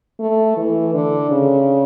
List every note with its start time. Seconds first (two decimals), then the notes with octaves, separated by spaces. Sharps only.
0.20 A3
0.57 E3
0.94 D3
1.31 C#3